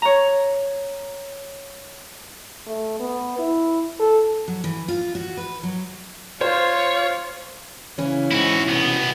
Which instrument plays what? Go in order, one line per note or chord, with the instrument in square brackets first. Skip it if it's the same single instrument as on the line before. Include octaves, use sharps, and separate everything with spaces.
[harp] C#5 A#5
[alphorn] A3
B3
E4
A4
[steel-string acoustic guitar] F#3
E3
F4
F#4
B4
F#3
[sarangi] F4 [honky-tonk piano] C5 [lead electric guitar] C#5
[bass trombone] C#3 [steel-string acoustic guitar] E3 C#4
[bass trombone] G#2 [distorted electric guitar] E4 F#4
[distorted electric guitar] C2 B3 [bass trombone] B2